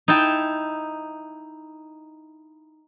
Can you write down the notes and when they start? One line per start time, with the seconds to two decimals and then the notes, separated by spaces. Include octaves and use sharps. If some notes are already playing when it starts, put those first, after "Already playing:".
0.08 D#4 E4 G5 A5